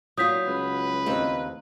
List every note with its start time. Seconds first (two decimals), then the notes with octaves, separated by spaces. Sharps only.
0.18 A#2 F#3 F4 D#6 G6 B6
0.47 C#2 B4
1.06 D#2 C4 D#4